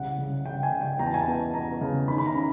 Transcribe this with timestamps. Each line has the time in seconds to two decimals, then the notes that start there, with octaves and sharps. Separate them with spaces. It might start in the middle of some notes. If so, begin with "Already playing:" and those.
Already playing: C2 C#3 F#5
0.18 C#3
0.45 C#3 G5
0.63 G#5
0.72 C#3
0.81 G5
0.99 E2 A#5
1.06 A5
1.14 G#5
1.21 A5
1.27 B3
1.54 B3 A#5
1.81 C#3
2.08 D#3 B5
2.18 B5
2.26 A#5
2.35 C#4